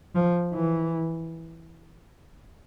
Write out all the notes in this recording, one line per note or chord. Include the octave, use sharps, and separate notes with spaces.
F3
E3